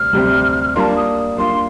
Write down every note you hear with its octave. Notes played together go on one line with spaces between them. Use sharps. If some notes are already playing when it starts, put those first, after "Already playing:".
Already playing: D2 C3 G3 C4 G4 F6
D2 C3 G3 C4 G4
G3 A#3 D4 F4 A5 C6
D#6
G3 A#3 D4 F4 C6